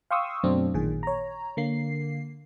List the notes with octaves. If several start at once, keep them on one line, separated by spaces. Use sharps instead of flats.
F5 G5 C6 C#6 D#6 E6
F#2 B2 F#3 A3 C4 D4
A1 A#2 D#3 G#4
C#5 A#5
D3 A#3 C7